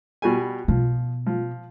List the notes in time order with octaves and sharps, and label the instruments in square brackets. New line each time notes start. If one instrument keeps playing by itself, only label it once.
[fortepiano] B2 G3 G#5
[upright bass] B2 [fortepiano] F3
[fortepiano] F3